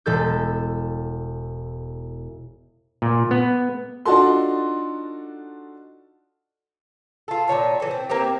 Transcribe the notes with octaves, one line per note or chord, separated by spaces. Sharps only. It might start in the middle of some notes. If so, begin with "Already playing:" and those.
E1 A4 G6
A#2
B3
D4 D#4 F4 F#4 A4 C6
F4 A4
A#2 D#3 C#5 A5
E3 A4
C4
A#3 C4 E4 G4